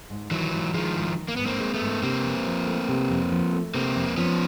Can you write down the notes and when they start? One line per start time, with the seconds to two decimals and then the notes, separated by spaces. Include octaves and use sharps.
0.10 G#2
0.31 D#3 E3 F#3
0.53 G#2
0.74 D#3 F3 G#3
0.96 G#2
1.17 D#3
1.28 A#3
1.36 G#2 B3
1.46 A#3 C4
1.60 G#3
1.74 A3 B3
1.81 G#2
2.03 C3 A#3 C4
2.25 F2
2.46 F3
2.67 A3
2.89 C3
3.10 F2
3.32 F3
3.53 A3
3.74 C3 A#3 C4
3.96 F2
4.17 F3 B3 C#4